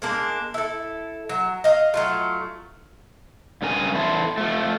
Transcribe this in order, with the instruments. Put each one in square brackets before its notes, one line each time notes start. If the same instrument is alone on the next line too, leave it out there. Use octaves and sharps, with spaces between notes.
[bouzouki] G#3 A#3 D4
E4 A4
F#3
D#5 F5
F#3 A3 F4
[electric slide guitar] G2 C#3 A#4 G#5
E2 E4 A4 C5
F3 A3